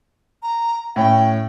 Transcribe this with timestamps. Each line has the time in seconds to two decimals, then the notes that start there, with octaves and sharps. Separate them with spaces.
0.43 A#5
0.96 A2 C#4 G5